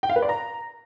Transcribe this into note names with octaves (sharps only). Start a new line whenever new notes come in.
G5
F5
B4
D5
A#5